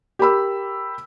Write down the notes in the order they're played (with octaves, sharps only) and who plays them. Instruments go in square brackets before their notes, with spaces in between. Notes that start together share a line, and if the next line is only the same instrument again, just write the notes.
[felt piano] G4 A#4 B5 E6